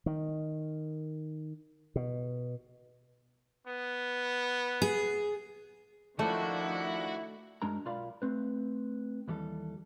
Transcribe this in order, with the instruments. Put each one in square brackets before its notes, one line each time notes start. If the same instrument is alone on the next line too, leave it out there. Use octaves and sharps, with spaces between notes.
[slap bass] D#3
B2
[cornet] B3
[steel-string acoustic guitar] G#4
[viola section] D#3 F3 D4 [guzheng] A3 [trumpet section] E4 [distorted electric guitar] F#4
[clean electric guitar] F#2 G#3 D4 A#4 A#5
B1 F4 A#4 D5 F5 B5
A3 C4 B4
D#2 E3 G3 A4